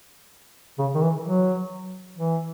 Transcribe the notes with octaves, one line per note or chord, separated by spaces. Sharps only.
C#3
D#3
E3
F#3
E3